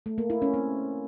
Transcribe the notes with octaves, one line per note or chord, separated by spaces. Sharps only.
A3
A#3
E4
C#4
C4